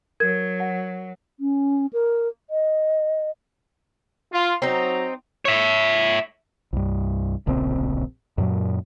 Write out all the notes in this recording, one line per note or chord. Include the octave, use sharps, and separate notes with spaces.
F#3 A#4 G#6
F#5
C#4
A#4
D#5
F4
F#3 C4 D#4 A#5
C#5 E5
C2 G2
D1 A#1 C#3 C4
F#2 A#2 F#3